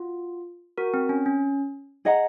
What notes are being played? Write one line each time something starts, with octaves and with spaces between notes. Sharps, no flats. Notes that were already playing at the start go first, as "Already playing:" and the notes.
Already playing: F4 F#4
F#4 A#4
C4
C#4
C#4
G#4 D#5 F#5 A#5